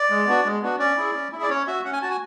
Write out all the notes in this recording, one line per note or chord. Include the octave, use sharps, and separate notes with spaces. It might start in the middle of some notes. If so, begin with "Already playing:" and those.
Already playing: D5
G#3
B3 D4 F#4
G#3
B3 D4 F#4
C#4 D5
E4 G#4
C#4
E4 G#4 E5
D5
C#4 C#5
F#4 E5
C#4 F#5
G#5
F#4 A5
G#5